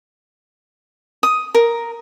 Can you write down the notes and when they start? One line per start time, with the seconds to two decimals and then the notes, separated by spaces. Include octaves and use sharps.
1.23 D#6
1.54 A#4